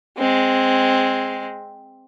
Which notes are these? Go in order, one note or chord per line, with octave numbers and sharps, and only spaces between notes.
G#3 C4